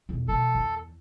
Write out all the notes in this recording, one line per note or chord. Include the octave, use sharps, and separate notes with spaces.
B1 E2
B2 E3 A4
E2